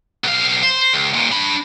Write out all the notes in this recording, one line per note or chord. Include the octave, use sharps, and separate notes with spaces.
B1 F5
C5
C#2
D#2 A#2
D4 B5